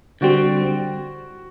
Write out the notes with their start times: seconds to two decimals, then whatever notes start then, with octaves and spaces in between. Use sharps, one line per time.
0.21 D3 G3 C4 F#4